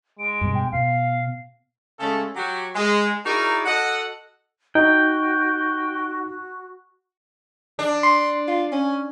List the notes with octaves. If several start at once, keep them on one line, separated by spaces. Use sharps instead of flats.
G#3 D7
G2 B2
G5
B2 F5 C7
C#3 G#3 A3 C#4 A4
F#3 F#4 G4
G#3
D#4 E4 F#4 G#4 A#4 D5
F#4 A4 D#5 F#5
D#4 F#4 G5
F#4
D4
C6
F4
C#4